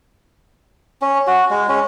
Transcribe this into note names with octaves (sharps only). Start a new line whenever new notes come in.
C#4
F#4
G#3
C#4